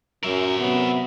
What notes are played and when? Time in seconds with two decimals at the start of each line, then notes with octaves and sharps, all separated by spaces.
0.23 F#2 A#4 E5
0.59 C3 F#3 B3